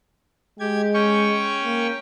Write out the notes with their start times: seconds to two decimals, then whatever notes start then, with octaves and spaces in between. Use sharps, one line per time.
0.60 G#3 G4 G#6
0.94 C#4 G5 C#6
1.64 A#3